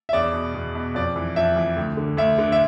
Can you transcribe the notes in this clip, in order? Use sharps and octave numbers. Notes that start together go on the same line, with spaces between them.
E5
E2 D5
B2
E2
B2
F2 D5
E3
F2 E5
E3
D2
D3
D2 E5
D3
E5